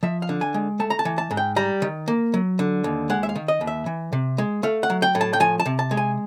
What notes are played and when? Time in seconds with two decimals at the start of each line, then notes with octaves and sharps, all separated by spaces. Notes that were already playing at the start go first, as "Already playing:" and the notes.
0.03 F3 E5
0.22 F5
0.29 D3
0.41 G#5
0.54 G#3
0.80 A3 A5
0.90 A#5
0.99 A5
1.05 E3
1.18 A5
1.31 G#2
1.37 G5
1.56 G3 A#5
1.82 D#3
2.08 A#3
2.34 F#3
2.59 D3
2.84 D#2
3.10 G#3 F#5
3.23 E5
3.29 F5
3.36 D#3
3.48 D#5
3.61 D#2
3.67 E5
3.86 E3
4.13 C3
4.38 G#3
4.63 A3 F5
4.83 F#5
4.90 F#3
5.02 G5
5.15 A2
5.21 A5
5.33 G5
5.40 F3 G#5
5.60 A5
5.66 C3
5.79 A5
5.91 G#3
5.97 G#5